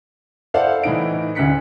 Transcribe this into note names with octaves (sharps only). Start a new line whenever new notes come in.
E4 A4 C5 D5 F5 F#5
A2 E3 D#4 D7
D2 C#3 F#6 B6 C#7